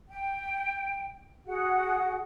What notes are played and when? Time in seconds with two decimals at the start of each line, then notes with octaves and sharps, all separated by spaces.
0.09 G5
1.46 F#4 G#4 F#5